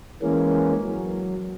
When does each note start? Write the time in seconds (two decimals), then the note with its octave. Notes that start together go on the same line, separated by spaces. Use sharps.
0.22 E3 G#3 A#3 C#4
0.84 F#3